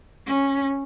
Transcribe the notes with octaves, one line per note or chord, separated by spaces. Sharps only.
C#4